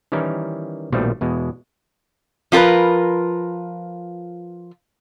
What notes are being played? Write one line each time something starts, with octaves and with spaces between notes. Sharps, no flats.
D#3 E3 G3 C#4 E4 A#4
A#1 B2 D#3 F3 G3 A3
E2 B2 G#3
F3 F4 G#4 A#4 B4